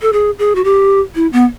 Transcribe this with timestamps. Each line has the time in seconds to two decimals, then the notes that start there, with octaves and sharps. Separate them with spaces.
0.02 A4
0.13 G#4
0.39 G#4
0.55 F#4
0.64 G4
1.15 E4
1.33 B3